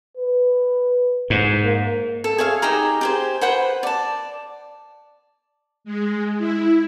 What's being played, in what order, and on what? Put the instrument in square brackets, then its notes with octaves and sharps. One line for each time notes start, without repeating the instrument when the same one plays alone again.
[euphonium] B4
[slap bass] G#2
[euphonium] A#3
[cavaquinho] A4
G#4 C#5 E5 F5
D#4 G4 G#4 A#5
G4 G#4 C5
B4 C5 F#5 B5
D5 A5
[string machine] G#3
E4